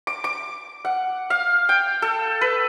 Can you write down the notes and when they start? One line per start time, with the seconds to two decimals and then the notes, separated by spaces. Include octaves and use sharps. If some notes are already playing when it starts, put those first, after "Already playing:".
0.07 D6
0.24 D6
0.85 F#5
1.30 F5
1.69 G5
2.02 A4
2.41 B4